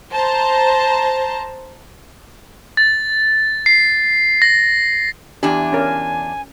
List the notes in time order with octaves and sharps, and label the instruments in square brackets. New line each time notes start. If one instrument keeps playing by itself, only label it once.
[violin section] C5 A5 A#5
[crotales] A6
C7
A#6
[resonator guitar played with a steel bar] E2 D4 [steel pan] G4 [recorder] G#5
[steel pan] C#4 A#4